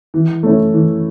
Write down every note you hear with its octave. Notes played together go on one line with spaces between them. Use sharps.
E3
A3 C#4 E4
E3